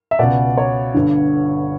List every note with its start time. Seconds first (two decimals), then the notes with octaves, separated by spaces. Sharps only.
0.11 E5
0.19 C#2 B2 D5
0.57 C#5
0.94 G1 G2 D3